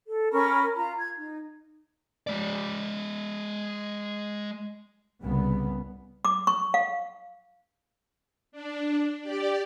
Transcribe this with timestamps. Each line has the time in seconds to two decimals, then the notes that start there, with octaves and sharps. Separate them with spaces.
0.08 A4
0.33 C#4 A#4 B5 C#6
0.77 F4 A#5
0.98 G#6
1.17 D#4
2.27 G#3 D5
5.21 C2 C#3 G3 B3
6.25 D6
6.47 C#6
6.74 F5
8.52 D4
9.21 G4 D5